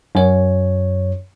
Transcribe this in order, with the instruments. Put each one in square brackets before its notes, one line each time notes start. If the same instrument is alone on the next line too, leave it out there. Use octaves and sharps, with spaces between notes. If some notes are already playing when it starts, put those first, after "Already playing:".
[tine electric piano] F#2 C#5